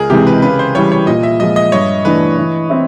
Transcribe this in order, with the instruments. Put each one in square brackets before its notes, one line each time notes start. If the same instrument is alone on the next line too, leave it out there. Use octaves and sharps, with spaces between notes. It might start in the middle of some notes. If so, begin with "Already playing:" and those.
Already playing: [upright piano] C#2 [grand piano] G#4 A#4
[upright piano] C3 E3 G#3 [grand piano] G4
[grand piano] B4
[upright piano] C#3 [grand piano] B4
[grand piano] C5
[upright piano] E3 G3 [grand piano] C#5
[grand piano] C#5
[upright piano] A#2 [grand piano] D#5
[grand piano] E5
[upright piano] F3 G#3 [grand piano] D#5
[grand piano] D#5
[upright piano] G2 [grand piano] C#5
[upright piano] E3 A3 D4 [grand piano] B4
[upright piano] E3
C4 E4